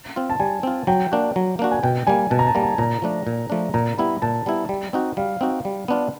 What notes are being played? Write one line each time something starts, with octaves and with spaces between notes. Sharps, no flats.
C4 F4
A5
G3 G#5
C4 F4
F#3 G5
A#3 D4 F#4
F#3
A#3 D4 F#4
G#5
B2 G5
G3 A#3 G#5
B2 A5
A#5
A5
G3 A#3 A#5
A5
A#2 A#5
F3 A3 D4
A#2
F3 A3 D4
A#2 A#5
G3 B3 E4 B5
A#2 A5
G3 B3 E4
G3
C4 D#4 F#4
G3 F5
C4 D#4 F#4
G3
B3 D4 F4